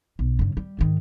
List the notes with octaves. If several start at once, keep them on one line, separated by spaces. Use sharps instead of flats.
B1
G2 C#3
G3
G#2 D#3